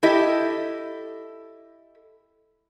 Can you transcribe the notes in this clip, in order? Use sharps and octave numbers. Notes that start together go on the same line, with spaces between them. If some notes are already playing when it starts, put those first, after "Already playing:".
E4 G4 A4 D#5